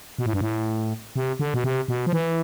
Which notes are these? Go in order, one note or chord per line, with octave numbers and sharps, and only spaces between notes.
B2
A2
G2
A2
C3
D3
B2
C3
B2
F3
E3